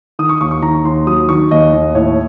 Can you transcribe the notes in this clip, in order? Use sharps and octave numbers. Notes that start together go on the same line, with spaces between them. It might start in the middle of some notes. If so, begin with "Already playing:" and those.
D#3 D#6
C#6
D#2 C#6
C#6
D#3 A#5
D#2 C6
F#3 D#6
D#3 C#6
D#2 D#5
D#2
A2 C#5